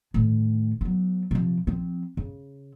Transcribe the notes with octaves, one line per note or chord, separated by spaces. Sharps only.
A2 D#3
F#3 B3
C3 F3
F3 C4
C#3